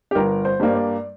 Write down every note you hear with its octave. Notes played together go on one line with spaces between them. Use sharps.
G4
G1 A#4
C5
G2 G3 A#3 C5
D5